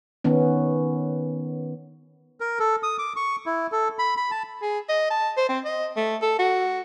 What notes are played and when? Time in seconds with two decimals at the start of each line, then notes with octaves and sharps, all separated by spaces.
0.24 D#3 B3 C#4
2.40 A#4
2.59 A4
2.83 D#6
2.98 D6
3.16 C#6
3.46 E4
3.72 A4
3.99 B5
4.17 B5
4.31 A5
4.62 G#4
4.89 D#5
5.10 A5
5.37 C5
5.49 C4
5.65 D#5
5.96 A3
6.22 A4
6.39 F#4